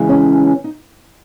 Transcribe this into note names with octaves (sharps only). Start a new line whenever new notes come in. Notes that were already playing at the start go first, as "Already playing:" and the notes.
Already playing: C#3 E3 G#3
C#4
D#4